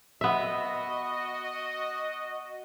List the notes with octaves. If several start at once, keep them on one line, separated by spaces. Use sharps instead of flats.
B3 F#4 D#5 E5